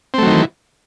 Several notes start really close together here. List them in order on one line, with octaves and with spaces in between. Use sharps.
C4 A3 F#3 D#3 E3